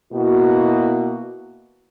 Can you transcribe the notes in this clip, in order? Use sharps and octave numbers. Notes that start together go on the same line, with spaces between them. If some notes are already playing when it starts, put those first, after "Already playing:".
B2 A#3 E4 F#4